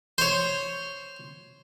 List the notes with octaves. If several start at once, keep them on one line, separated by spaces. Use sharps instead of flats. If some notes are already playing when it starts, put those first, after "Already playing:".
C5 C#5